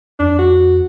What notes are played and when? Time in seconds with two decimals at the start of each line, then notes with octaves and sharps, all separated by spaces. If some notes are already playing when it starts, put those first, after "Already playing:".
0.19 F2 D4
0.39 F#4